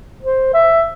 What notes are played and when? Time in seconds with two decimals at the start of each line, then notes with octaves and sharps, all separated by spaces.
0.23 C5
0.54 E5